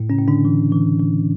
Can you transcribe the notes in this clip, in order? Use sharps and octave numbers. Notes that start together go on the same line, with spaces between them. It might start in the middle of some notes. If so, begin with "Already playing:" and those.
Already playing: A2
C#3 C#4
A2
D3 D4
E3
E3
E3